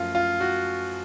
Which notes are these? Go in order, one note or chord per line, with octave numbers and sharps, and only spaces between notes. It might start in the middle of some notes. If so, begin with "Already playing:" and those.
Already playing: F#2 F3 A3 F4
F4
F#4